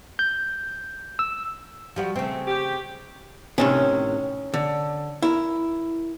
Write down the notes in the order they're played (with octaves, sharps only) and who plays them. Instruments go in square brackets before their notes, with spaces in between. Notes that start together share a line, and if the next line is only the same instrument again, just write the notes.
[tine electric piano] G6
E6
[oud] F3 G3 F#4
[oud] C#3 C4 [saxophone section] A3
[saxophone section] G4
[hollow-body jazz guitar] A2 C3 D#3 [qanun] C#4
[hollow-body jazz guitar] D3
E4 A#4